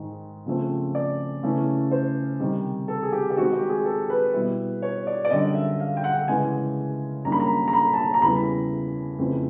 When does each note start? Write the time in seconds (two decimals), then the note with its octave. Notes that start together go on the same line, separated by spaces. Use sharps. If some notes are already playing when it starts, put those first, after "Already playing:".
Already playing: G#2 D#3 G#3
0.46 C#3 F3 A3 C4
0.95 D5
1.43 C#3 E3 A3 C#4 E4
1.91 C5
2.40 C3 D#3 G3
2.88 A4
3.03 G#4
3.12 G4
3.30 G4
3.37 D#3 G#3 C4 F#4
3.53 G4
3.69 G#4
3.85 A4
4.10 B4
4.34 B2 G3 B3 E4
4.82 C#5
5.07 D5
5.25 D5
5.31 F#2 D3 G3 D#5
5.55 E5
5.80 F5
5.97 G5
6.04 F#5
6.28 C#3 E3 G#3 C#4 G#5
7.25 F#2 D#3 G3 A#3 D4 A#5
7.32 B5
7.40 A#5
7.68 A#5
7.73 B5
7.94 A5
7.97 A#5
8.14 A#5
8.22 E2 C#3 E3 G3 B5
9.19 F2 C#3 E3 A3 C4